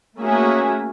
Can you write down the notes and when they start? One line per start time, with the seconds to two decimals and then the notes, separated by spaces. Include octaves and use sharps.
0.19 A3 A#3 C#4 F#4 G#4 E5